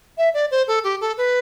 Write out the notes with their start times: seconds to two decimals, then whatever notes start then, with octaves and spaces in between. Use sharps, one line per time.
0.18 E5
0.34 D5
0.51 C5
0.68 A4
0.84 G4
1.01 A4
1.18 B4